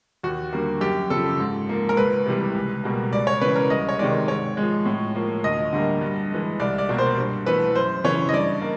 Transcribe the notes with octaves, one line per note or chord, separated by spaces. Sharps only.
D#2 F#4
D3 G3 A#3
F#2 G4
C#3 F3 A4
G#2
F3 A#3
A#4
C#2 B4
C3 E3 G3
C#2
B2 G3 A#3
C#2 D5
C#5
C#3 E3 B4
A#4
C2 D#5
C#5
C3 D#3 G#3 D5
G#2 C#5
F3 G#3
A2
F3 A#3
D2 D#5
D3 G3 A#3
G2
E3 G#3
C2 D5
D5
B2 G3 A#3
C5
G2
E3 A3 B4
F#2 C5
C#3 E3 C#5
D#5
G2 D5
A#3